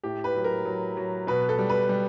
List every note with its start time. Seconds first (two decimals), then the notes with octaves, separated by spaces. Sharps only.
0.03 A2 G4
0.24 B4
0.35 F#3
0.44 A#4
0.65 F#3
0.97 F#3
1.27 B2 B4
1.49 A4
1.58 G3
1.70 B4
1.89 G3